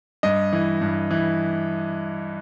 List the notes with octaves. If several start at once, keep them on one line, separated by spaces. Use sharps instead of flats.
G2 D#5
E3
G2
E3